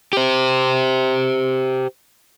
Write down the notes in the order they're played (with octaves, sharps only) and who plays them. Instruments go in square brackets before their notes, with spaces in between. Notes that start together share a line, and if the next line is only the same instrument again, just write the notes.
[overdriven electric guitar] G4 C5